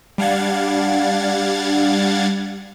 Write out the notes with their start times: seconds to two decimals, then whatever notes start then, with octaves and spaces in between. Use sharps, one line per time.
0.18 G3 D4 F5 F#5 G#6 A6